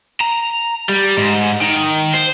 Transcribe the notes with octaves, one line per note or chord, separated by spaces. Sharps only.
A#5
G3
G#2
D#3
C5